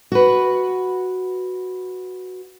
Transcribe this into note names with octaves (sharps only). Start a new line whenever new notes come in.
F#4 B4